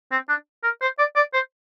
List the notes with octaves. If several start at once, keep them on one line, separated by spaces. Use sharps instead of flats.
C4
D4
A#4
C5
D5
D5
C5